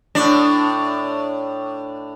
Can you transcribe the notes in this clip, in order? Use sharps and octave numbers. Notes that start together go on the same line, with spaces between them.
A2 D4